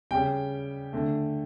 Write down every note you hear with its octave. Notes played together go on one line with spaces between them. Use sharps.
C#3 G3 G5
D3 A3